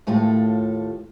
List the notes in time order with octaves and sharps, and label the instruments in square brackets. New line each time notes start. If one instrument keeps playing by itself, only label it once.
[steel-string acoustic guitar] D#2 A2 A3 F4 A4